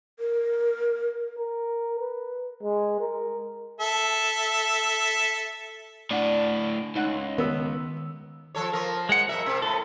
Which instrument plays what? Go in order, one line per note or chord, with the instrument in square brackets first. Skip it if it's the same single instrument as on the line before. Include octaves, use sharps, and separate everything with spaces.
[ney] A#4
[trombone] A#4
B4
G#3
A#4
[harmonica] A4 E5
[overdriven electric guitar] A2 D4 [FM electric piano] D5 F#5
[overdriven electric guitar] C#2 [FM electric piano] D#4 F#5 F#6
[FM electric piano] D#3 E6 [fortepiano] B3
[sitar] F3 A4 C#5
[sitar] F3 [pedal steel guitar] A#4
[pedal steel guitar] G#3 F#5
[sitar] F2 E5 [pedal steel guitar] A#4
[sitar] C3 C4
[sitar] A2 [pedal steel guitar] A4